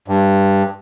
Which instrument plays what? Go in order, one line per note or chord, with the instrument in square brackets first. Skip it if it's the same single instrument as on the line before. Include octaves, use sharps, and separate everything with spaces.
[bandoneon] G2